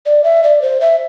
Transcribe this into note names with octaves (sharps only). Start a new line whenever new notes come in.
D5
E5
D5
C5
E5